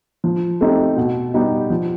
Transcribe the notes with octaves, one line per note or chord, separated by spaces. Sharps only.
F3
A3 C4 D#4 G4
B2
G3 B3 D#4 G4
F3